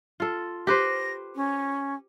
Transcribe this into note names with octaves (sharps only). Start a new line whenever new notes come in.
F4 A4
G4 B4 C5 A#6
C#4